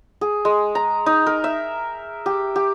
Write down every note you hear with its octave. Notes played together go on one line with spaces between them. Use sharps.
G#4
G#3
A#5
D#4
A#4
E5
G4
G4